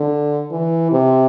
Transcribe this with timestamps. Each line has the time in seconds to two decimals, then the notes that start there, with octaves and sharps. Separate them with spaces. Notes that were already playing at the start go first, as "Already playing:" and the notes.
Already playing: D3
0.52 E3
0.92 C3